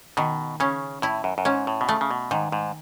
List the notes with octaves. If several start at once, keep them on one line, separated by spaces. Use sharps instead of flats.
B2 D#3
C#3 C#4
A2 E4
F#2
F#2
G#2 C#4
A2
B2
C#3 A3
C#3
B2
G#2 D#3
G#2